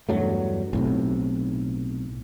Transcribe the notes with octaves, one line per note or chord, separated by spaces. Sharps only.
E2 G2 F#3 A3
B1 A2 C3